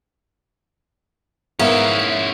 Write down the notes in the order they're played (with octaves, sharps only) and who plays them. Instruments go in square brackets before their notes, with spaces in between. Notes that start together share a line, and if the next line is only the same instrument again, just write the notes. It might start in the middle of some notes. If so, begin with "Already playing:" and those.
[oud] G#2 G#4 A#4 [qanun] B3 [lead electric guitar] C#4 E4 [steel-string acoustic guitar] E5 F5